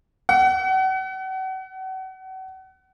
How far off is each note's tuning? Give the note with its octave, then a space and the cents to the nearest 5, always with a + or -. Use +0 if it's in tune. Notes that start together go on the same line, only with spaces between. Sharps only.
F#5 +35